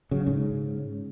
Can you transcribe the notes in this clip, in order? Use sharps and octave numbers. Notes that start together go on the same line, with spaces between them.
C#3 F#3
G#2 C#3